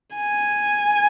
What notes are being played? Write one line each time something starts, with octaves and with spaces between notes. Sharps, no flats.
G#5